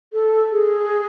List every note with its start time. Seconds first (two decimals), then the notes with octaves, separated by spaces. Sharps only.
0.13 A4
0.52 G#4